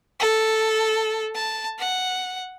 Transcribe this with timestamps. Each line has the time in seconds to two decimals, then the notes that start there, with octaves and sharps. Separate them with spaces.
0.20 A4
1.35 A5
1.79 F#5